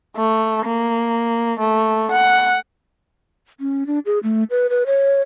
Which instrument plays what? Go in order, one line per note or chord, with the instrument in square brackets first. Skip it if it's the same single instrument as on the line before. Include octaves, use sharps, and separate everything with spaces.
[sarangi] A3
A#3
A3
F#5
[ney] C#4
D4
G#4
A3
B4
B4
C#5